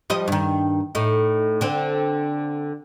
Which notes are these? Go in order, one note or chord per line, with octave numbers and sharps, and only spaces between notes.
F3 G3 D#5
G2 D#3
A2 D#4
D3 C4